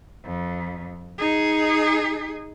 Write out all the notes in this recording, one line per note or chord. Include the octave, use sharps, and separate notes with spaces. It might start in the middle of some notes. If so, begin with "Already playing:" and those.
F2
D#4 G#4